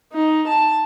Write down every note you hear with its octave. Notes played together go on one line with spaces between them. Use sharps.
D#4
A5